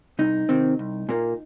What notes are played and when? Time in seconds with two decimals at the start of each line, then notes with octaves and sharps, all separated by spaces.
0.19 C2 D#4
0.49 C3 D#3 C4
0.79 C2
1.09 A#2 A#3